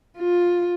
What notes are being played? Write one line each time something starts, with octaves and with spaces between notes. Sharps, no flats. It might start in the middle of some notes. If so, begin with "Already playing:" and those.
F4